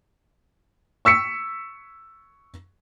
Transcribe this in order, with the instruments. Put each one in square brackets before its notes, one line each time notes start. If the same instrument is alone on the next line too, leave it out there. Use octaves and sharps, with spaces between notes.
[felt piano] C#6 E6 B6 C#7